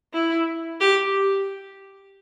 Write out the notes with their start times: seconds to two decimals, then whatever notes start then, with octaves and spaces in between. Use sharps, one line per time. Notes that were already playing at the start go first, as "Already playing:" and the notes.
0.13 E4
0.80 G4